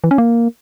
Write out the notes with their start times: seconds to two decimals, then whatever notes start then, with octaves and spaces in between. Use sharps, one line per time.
0.04 E3
0.11 C#4
0.18 A#3